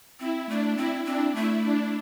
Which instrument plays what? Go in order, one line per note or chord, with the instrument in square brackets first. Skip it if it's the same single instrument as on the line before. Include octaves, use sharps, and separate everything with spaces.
[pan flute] C4 [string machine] E4
[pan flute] A3 [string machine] D4
[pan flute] C4 [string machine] E4
[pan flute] C4 [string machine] D4
[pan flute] A3 [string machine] E4
[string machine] D4